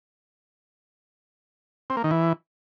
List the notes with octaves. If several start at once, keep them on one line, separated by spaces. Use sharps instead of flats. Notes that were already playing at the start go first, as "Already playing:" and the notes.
C4
A#3
D#3
E3